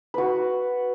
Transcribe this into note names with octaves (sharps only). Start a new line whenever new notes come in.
F#4 B4